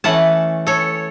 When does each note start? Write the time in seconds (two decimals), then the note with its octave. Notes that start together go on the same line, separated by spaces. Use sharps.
0.04 E3 A3 C#4 F#5 A5
0.67 A4 C#5